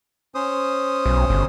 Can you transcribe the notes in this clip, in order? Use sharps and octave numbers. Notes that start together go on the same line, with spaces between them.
C#4 C5 D#6
B1
G1